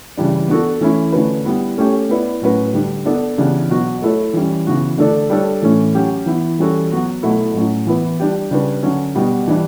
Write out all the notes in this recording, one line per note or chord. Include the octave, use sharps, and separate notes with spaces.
C#3 E3 G3 D4
B3 D4 F#4 A4
E3 A3 C#4 E4
D3 A3 C#4 F#4 B4
G3 B3 E4
A3 C#4 G4 C#5
B3 E4 B4 D5
A2 F#3 C#4 F#4 B4
D3 G3 D4
B3 D4 A4 D5
C#3 E3 B3 D4 G4
B2 F#3 B3 F#4
A3 E4 A4 C#5
E3 G3 C#4
C#3 E3 B3 F#4
D3 A3 D4 A4 D5
G3 D4 A4 C#5
A2 E3 A3 C#4
F#3 C#4 G4
E3 B3 E4
E3 G3 C#4 F#4 A4
F#3 B3 F#4
B2 F#3 A3 E4
A2 F#3 C#4
E3 B3 E4 B4
G3 D4 G4
C#3 G3 D4 F#4 B4
D3 F#3 C#4
B2 G3 B3 F#4
E3 G3 D4